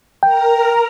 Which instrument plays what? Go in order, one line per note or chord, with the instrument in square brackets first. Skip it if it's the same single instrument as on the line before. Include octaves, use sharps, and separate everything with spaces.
[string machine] A#4 A#5 [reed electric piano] G5